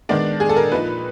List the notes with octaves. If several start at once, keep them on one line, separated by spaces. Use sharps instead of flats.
D#3 G#3 B3 D4 D5
G#4
A4
A#4
A#2 F3 A#3 D#4 B4